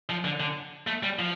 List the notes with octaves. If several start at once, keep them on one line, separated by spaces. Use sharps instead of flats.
F3
D3
D3
A3
G3
F3